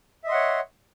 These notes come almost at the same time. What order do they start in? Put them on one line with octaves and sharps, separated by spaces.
E5 D#5 C6 F#5 C#5